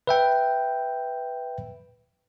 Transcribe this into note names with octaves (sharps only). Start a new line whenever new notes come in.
B4 E5 G5